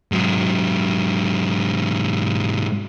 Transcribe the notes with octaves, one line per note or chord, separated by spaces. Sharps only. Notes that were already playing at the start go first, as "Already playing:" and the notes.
G#2 F#3